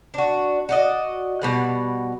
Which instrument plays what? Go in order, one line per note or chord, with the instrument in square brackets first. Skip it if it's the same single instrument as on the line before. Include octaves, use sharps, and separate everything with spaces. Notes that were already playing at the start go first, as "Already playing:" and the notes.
[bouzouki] D4 F#4
F#4 D5 D#5
B2 G3 F#5